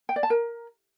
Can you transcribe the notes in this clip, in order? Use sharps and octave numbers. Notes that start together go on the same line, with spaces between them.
G5
D5
A5
A#4